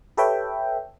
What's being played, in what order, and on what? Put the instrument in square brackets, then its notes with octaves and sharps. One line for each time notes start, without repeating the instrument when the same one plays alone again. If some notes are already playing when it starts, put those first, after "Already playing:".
[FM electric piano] G4 A4 B4 C#5 E5 G5